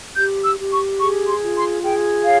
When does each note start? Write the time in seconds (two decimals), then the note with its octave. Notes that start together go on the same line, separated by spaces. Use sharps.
0.16 G4 G6
0.43 E6
0.58 G4
0.71 C#6
0.99 G#4 C#6
1.27 C6
1.40 F4
1.55 C6
1.82 G#4 G5
2.24 C#5 F5